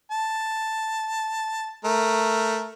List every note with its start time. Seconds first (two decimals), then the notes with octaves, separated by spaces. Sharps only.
0.11 A5
1.84 A3 A#4